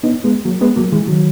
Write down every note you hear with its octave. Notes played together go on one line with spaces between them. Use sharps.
B3 D#4
G#3 B3
F#3 A#3
G#3 B3
F#3 A#3
E3 G#3
D#3 F#3